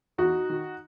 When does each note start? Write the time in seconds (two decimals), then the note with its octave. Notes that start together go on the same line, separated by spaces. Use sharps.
0.18 E2 D#4 F#4
0.50 D#3